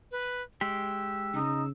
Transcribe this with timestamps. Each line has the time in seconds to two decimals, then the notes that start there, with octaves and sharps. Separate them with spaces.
0.11 B4
0.61 G#3 G4 E6
1.34 C#3 D#4